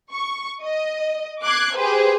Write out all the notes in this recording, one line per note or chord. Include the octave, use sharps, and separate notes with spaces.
C#6
D#5
D6 F#6 G#6 C7
G4 G#4 B4 C5